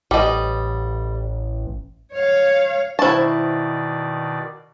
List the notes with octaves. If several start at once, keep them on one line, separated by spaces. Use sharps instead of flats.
A1 G3 D#5
C#5 F5
B2 D#3 E4 C5 D5 A5 C#6